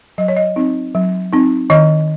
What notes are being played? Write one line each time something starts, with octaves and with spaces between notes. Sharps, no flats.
F#3 D#5
C#5
D#5
C4 D#4
F#3
C4 D#4
D#3 D#5